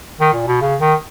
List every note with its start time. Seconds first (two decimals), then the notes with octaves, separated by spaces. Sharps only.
0.20 D#3
0.33 A#2
0.48 B2
0.61 C#3
0.80 D#3